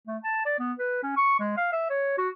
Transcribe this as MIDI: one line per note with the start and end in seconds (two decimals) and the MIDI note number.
0.07 0.18 57
0.24 0.42 81
0.46 0.59 74
0.59 0.73 59
0.79 1.00 71
1.03 1.16 61
1.17 1.39 85
1.40 1.55 56
1.57 1.69 77
1.72 1.86 76
1.90 2.13 73
2.18 2.29 66